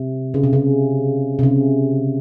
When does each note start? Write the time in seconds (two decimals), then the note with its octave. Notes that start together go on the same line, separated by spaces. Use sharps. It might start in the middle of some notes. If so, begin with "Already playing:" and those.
Already playing: C3
0.34 C#3
0.43 C3
0.53 C#3
1.39 C3
1.43 C#3